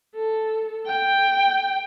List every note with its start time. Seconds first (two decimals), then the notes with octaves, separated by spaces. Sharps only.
0.15 A4
0.87 G5